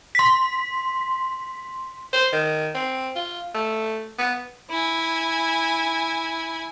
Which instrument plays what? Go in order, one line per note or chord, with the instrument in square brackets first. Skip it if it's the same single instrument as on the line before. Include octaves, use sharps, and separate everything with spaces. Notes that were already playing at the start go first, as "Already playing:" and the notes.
[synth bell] C6 B6
[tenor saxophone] C5
D#3
C4
F4
A3
B3
[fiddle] E4 G#5